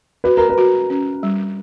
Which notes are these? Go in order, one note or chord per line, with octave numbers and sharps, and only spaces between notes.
F#4 B4
A#4
B4
F#4
C#4
G3